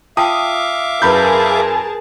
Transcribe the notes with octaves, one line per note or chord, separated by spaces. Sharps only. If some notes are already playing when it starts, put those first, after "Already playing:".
F4 E5 F5 G5 A5 D6 D#6
F#2 E4 G#4 A#4 B4 A5 B5 G6